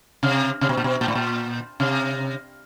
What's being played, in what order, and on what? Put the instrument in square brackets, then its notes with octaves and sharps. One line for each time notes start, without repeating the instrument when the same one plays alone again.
[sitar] C3
C3
B2
A#2
B2
A#2
A2
A#2
C3